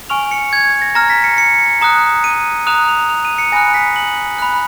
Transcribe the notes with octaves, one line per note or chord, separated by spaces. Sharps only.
G#5 C#6 F6 F7
C#7
G#6
A#6
A#5 F6 A#6
B6
C#7
C#7
A#5 D#6 F#6
D#7
A#5 D#6 F#6 F7
F7
F7
D#7
C#7
G#5 B5 D#6 F#6 A#6
B6
F#7
B5 F#6